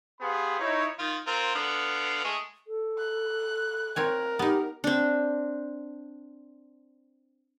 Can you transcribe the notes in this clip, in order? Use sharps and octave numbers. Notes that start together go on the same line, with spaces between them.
B3 G4 G#4 C5 F5 B5
D#4 E4 C#5
D#3 F4
C4 F4 A#4
D3 B3 F5
G#3 A3 G#4
A4
F#6
C4 A#4 C#5 G#5
B3 D#4 G4
C4 D4